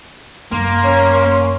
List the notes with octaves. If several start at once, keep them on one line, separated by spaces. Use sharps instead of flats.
F1 F#2 A#3 C6
C#4